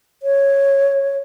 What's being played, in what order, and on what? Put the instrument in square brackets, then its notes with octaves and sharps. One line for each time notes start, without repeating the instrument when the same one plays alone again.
[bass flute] C#5